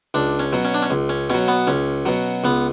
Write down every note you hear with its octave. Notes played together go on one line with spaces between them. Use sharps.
C#2 D4
C#4
B2 F#3
C#4
D4
C#4
C#2
C#4
B2 F#3 C#4
B3
C#2 C#4
B2 F#3
C#2 B3